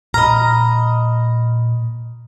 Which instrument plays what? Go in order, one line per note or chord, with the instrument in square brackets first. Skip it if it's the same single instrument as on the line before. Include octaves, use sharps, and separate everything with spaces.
[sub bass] A#2 [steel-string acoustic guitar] D#5 A#5 [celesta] B5 F6